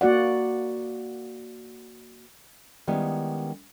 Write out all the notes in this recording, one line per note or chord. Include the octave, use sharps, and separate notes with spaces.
A#3 F#4 D5 F#5
D#3 G3 G#3 B3 C#4 E4